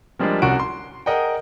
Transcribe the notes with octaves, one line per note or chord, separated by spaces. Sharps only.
F3 G3 G#3 A#3 D4
C2 C#4 F#4 F#5 D7
C6
G#4 A#4 D#5 F#5 G5